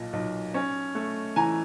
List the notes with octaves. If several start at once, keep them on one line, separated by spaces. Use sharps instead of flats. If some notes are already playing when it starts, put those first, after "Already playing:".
Already playing: B1 A#2
B1
C#4
A3
E3 G#5 A#5